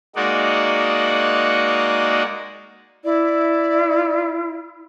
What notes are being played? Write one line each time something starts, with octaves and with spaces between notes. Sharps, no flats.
G#3 A#3 D#4 F#4 D5 F#5
E4 D5